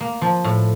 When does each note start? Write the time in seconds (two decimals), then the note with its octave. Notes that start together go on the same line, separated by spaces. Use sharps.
0.01 A#3
0.22 F3
0.44 A2